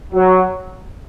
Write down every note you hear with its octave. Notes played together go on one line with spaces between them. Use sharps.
F#3